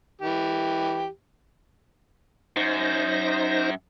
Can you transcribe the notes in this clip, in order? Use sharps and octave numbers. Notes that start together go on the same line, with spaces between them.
E3 G4
F#2 D#4 C5 A#6